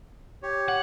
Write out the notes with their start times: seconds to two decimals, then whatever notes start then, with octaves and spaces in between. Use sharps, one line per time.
0.43 G4 C#5
0.68 F#5